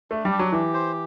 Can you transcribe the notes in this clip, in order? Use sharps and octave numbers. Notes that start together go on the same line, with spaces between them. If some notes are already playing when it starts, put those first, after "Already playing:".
A3 D4
G3
G4
F#3
E3 G4
C5